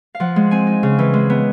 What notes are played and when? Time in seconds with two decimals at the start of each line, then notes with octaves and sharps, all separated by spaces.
0.15 F5
0.20 F3 F#5
0.36 G#3
0.51 C4 G#5
0.67 D#4
0.83 C#3
0.99 E3
1.14 G#3
1.30 B3